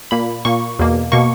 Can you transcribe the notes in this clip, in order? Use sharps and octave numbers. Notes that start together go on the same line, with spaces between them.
A#2 A#3 B5
A#2 A#3 C#6
E2 B2 A#3
B2 A#3 C#6